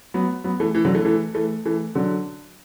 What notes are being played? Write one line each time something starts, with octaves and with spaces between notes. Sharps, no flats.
F#3 B3
F#3 B3
E3 A3
E3
D3 F#3
E3 A3
E3 A3
E3 A3
E3 A3
D3 F#3